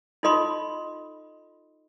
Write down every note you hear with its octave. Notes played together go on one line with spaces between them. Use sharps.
D#4 F4 A4 D#5 B5 C6